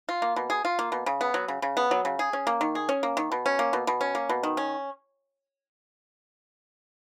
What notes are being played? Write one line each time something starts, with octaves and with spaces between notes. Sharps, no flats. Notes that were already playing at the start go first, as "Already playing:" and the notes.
F4
A#3
B2
G#4
F4
A#3
B2
C#3
B3
F#3
C#3
C#3
B3
F#3
C#3
G#4
C#4
A#3
D#3
G#4
C#4
A#3
D#3
B2
C#4
A#3
B2
B2
C#4
A#3
B2
D#3
C#4